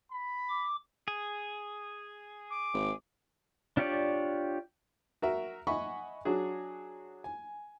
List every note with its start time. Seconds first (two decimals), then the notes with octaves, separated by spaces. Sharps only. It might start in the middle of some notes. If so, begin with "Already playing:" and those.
0.12 B5
0.49 D6
1.08 G#4
2.51 D6
2.74 G#1
3.77 D4 F4 G4 C#5 D5
5.22 F#4 A#4 E5
5.67 D#5 E5 F#5 G#5 B5 C#6
6.25 F#3 D4 F#4 G#4
7.24 G#5